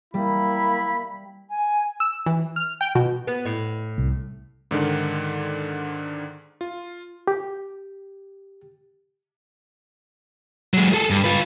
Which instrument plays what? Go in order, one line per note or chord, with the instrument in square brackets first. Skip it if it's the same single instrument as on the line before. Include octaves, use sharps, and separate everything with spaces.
[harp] G3 [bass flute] A#3 [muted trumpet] E4 [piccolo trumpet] B5
[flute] G#5
[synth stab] E6
E3
F6
G5
B2
[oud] B3
A2
[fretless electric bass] C2
[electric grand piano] G#2 D3 D#3
F4
[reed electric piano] G4
[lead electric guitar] F#3 G#3
G#4 A4
G2
F4 B4